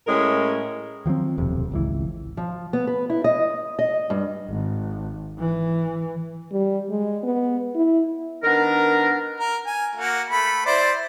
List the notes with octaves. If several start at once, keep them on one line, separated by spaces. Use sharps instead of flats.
A2 G#3 C#4 A#4
D#3 F3 F#3 C4
D#1 B1 F2 C3
G#1 C#2 E3
F3
B3
B4
E4
D#5
D#5
G2
G#1
E3
G3
G#3
B3
E4
D#3 B3 D4 A#4
A#4
G#5
A#3 F#4
A3 B5
E4 C5 D5